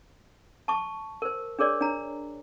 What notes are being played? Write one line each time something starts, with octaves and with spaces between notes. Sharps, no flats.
A5 C#6
A#4 C5
D4 G#4 A#4 C#5 D5
D4 A#5